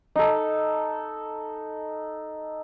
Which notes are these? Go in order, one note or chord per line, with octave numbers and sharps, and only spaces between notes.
D#4 A4